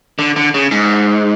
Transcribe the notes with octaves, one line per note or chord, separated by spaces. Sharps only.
D3
D3
C#3
G#2